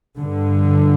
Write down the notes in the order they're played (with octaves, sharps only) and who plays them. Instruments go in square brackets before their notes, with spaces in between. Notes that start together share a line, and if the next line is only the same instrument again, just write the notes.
[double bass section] G2 D3